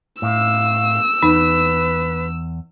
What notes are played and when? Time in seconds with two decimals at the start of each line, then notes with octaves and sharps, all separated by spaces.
0.22 A2 F5 E6
1.23 E2 D#4 B4